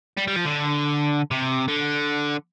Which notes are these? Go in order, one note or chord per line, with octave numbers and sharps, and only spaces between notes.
G3
G3
F3
D3
C3
D3